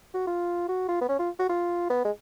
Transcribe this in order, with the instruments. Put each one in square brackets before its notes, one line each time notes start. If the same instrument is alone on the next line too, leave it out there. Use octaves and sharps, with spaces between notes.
[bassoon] F#4
F4
F#4
F4
B3
C#4
F4
F#4
F4
B3
G#3